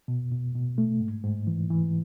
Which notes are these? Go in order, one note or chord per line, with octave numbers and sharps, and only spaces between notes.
B2
B2
B2
A3
G#2
G#2
E3
E3